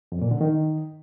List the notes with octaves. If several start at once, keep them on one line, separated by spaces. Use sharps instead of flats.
F2
A#2
D3
D#3